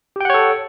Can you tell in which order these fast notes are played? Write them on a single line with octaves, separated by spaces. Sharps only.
G4 G5 F#5 C#5 A4